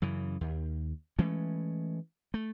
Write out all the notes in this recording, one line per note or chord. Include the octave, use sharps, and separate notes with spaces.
F#2 C#3 E3
D#2
E3 G#3 A3 C#4
A3